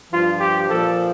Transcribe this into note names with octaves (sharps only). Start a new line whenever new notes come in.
G2 F3 F4
G4
A#2 F3 A4